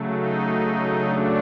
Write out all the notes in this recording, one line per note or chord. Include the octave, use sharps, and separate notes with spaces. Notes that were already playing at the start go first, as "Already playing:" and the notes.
Already playing: C#3 F#3 A3
D#4
D4